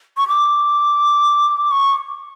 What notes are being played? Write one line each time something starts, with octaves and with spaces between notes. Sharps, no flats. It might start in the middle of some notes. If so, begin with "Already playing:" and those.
C#6
D6
C#6